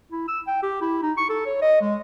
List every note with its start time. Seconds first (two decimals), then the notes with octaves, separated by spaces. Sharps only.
0.12 E4
0.28 E6
0.47 G5
0.63 G4
0.82 E4
1.03 D#4
1.17 C#6
1.29 A4
1.46 C#5
1.62 D#5
1.82 G#3